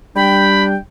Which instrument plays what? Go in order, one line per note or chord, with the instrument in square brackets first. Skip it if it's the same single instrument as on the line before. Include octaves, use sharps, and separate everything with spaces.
[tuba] G3 [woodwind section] D4 G5 [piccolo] B5